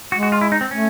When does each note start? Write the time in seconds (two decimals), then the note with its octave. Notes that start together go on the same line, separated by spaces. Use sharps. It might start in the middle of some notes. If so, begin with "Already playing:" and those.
0.12 G#3 F#4
0.23 F#4
0.32 F4
0.41 E4
0.52 D#4
0.61 C4
0.71 A3 C#4